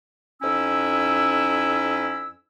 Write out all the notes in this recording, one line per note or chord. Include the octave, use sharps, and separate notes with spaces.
F2 C#4 D#4 E4 E6